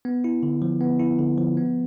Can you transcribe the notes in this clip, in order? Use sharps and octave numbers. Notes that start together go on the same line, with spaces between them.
B3
E4
D3
F3
B3
E4
D3
F3
B3